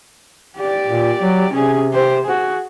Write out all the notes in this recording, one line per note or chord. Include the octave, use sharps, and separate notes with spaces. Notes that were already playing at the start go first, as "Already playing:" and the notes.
G4 D5
A#2
F#3
C3 C#4 G#4
G4 C5
F#4 G#4